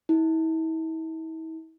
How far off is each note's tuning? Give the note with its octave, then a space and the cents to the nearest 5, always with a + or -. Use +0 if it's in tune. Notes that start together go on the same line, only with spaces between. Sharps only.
E4 -40